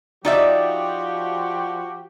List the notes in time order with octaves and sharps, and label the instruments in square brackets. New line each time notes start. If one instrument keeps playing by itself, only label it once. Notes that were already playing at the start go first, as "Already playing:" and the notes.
[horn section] F3 F#4 G4 [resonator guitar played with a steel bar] D#4 D5 E5